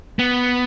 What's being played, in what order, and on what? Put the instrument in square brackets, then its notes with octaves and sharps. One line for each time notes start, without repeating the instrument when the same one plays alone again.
[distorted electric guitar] B3